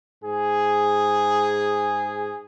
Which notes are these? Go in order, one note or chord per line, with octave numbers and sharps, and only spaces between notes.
G#2 G#4